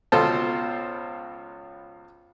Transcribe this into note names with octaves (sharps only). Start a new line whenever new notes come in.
C#2 B2 F4 A4 C5 A5